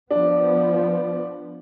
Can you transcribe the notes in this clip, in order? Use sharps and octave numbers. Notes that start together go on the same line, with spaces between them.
F3 B3 D4